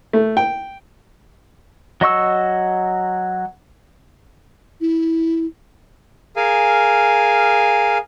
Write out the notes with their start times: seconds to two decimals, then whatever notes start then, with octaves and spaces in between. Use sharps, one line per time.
0.13 A3
0.37 G5
2.01 F#3 D#5 C#6 E6
4.81 E4
6.36 G#4 A#4 F5 G#5